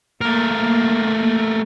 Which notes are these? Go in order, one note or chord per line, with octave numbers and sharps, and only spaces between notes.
A3 A#3 A#4